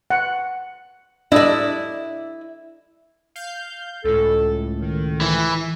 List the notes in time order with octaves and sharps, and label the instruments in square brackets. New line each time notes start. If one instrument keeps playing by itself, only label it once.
[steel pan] F#5
[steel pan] D4 D#5 [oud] E4 D5
[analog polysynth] F5 G6
[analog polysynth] C#2 A2 [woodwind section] A4
[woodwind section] D#3
[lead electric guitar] E3